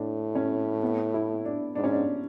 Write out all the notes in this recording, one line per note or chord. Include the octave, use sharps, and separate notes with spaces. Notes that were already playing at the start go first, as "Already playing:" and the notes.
Already playing: A2 D4
C#4
B3
E4
D4
G#2 D4
C#4
D4